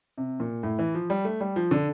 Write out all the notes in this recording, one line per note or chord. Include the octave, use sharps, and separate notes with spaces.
C3
A#2
A2
E3
F3
G3
A3
G3
F3
D3